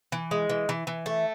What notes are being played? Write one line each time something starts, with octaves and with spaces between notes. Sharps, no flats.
E3
G#3
E3
E3
E3
A3